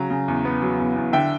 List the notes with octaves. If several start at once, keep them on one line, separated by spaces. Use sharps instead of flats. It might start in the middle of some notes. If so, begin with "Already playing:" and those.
Already playing: C#3 F#3 A#5
C#3
E2
B3
F#3
E2
E2
D3 E5 G5